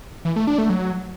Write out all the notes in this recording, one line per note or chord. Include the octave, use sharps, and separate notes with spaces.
E3
A3
D4
A3
F#3